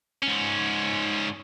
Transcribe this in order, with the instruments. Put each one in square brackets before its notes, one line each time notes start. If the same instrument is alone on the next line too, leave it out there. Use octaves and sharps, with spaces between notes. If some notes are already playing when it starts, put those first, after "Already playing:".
[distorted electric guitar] G#2 C#4